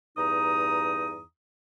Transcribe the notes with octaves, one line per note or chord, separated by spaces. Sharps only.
E2 G2 D#4 A#5 D#6